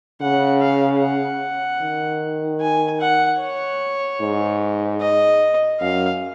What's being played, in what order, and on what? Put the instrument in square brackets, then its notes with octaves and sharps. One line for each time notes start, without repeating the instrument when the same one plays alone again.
[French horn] C#3 [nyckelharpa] F#5
[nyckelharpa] F5
F#5
[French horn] D#3
[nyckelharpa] G#5
F#5
C#5
[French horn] G#2
[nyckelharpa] D#5
[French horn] F#2 [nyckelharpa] F5